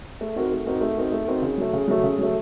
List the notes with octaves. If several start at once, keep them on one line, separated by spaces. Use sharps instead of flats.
A3
C4 D#4 F#4 A#4
A3
C4 D#4 F#4 A#4
A3
C4 D#4 F#4 A#4
A3
C4 D#4 F#4 A#4
C#3
F#3 A3
C#3
F#3 A3
C#3
F#3 A3